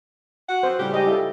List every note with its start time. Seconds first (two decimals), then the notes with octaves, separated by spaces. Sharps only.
0.49 F#4 F#5
0.63 F3 C4 C5
0.79 A2 C#3 G3 G4
0.93 G#2 G4 D#5 G5
1.07 E4 F4 A4